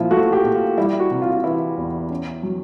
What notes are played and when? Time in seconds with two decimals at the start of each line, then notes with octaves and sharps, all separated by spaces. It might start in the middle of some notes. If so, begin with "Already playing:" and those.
Already playing: A#2 F3 E4 F4
0.11 A3 F#4
0.33 G4
0.44 A#2
0.55 F4
0.77 G3 E4
1.00 F#4
1.11 C3
1.22 F4
1.29 F#4
1.37 F4
1.44 E3 E4
1.77 E2
2.10 C#4
2.43 F#3